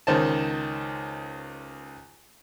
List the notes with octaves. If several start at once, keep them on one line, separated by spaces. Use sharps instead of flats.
C#2 D#3 C5 A5